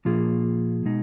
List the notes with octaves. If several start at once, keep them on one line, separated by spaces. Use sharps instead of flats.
A#2 F3 A#3 F4 G#4
B2 G#3 D#4